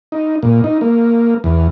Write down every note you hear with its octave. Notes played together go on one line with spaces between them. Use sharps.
D#4
A#2
D#4
A#3
E2